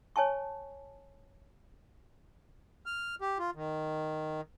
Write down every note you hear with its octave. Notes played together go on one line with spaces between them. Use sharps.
C#5 G#5 A5 C#6
F6
G4
F4
D#3